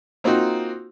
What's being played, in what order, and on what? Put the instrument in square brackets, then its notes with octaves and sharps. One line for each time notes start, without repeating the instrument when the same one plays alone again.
[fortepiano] A#3 C4 D#4 F4 F#4